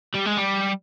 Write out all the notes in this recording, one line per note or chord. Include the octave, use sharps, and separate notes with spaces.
G3
G#3
G3